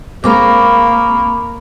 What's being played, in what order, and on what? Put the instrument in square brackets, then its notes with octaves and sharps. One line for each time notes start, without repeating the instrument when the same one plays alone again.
[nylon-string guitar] G#3 C4 [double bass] A#3 [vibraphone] B5 C#6 D6